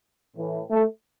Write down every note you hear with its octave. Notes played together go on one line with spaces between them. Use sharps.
A2 E3
A3